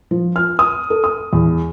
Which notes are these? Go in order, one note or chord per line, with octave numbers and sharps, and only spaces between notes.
F3
F6
D#6
A4
D#6
E2